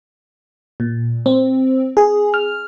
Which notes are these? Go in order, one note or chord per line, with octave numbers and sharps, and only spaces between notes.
A#2
C4
G#4
F6